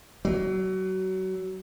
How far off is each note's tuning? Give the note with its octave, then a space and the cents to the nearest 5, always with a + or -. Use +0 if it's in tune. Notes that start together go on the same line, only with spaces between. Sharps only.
F#3 +25